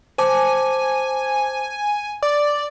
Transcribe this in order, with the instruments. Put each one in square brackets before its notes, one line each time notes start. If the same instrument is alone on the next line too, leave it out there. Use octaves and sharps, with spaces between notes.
[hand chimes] C5 A5 D6 [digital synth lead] G#5
[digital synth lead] D5 [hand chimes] D6